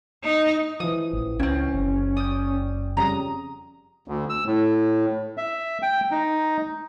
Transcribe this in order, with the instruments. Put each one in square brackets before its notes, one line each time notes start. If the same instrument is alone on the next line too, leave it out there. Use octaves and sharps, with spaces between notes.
[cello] D#4
[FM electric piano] E3 F3 [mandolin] D#6
[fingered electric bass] A1
[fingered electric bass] C#2 [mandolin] A#3 C4 [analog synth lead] C#4
[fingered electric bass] F#1
[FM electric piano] D5 G5 [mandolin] D#6
[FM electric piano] F2 C#3 G3 [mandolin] A#5 D#6
[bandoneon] D2
E6
A2
E5
G5
D#4